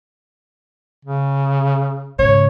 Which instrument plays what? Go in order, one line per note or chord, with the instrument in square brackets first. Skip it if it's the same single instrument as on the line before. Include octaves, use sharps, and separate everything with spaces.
[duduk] C#3
[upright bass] G#2 C#3 [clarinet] C#5